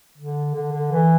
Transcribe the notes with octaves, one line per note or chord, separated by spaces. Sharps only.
D3
D3
D3
E3